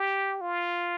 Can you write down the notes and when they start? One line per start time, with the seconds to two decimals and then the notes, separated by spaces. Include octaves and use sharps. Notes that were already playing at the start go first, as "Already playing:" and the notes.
Already playing: G4
0.41 F4